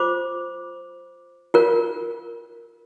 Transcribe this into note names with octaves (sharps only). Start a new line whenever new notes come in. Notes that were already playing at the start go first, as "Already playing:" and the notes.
Already playing: F4 C5 D6
F4 A#4